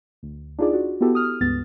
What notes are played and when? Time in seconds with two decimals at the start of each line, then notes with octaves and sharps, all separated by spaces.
0.23 D2
0.59 D4 D#4 F4 G#4 D5
0.74 F#4
1.01 B3 E4 F#4 G4 A4
1.15 D#6 F6
1.41 C#2 G2 B3 A6